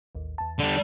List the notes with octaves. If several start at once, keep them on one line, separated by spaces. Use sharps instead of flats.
A1 D#2
E2 A5
D3 G3